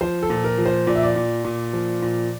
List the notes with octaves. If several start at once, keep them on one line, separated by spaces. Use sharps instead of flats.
F3 C5
A4
A#2
A#4
F3
C5
A#2 D5
E5
D5
A#2
A#2
F3
A#2